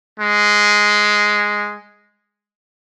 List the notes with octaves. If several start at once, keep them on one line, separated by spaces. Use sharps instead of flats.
G#3